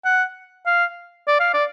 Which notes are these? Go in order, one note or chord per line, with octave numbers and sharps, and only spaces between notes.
F#5
F5
D5
F5
D5